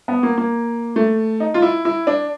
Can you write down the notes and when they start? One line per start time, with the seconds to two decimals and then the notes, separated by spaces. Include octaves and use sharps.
0.08 B3
0.23 A#3
0.38 A#3
0.96 A3
1.40 D#4
1.54 F4
1.62 E4
1.85 E4
2.07 D4